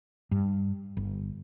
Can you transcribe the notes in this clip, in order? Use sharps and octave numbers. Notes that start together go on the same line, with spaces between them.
G2
G1